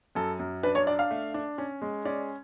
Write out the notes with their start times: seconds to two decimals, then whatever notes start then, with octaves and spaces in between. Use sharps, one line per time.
0.15 F#2 A4
0.39 F#2
0.63 D4 B4
0.75 C#5
0.87 D4 D5
0.99 F5
1.11 A3
1.34 D4
1.58 C#4
1.82 G#3
2.05 C#4 D5